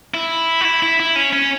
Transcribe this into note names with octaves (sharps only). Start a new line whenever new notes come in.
E4
F#4
E4
E4
E4
C#4
C#4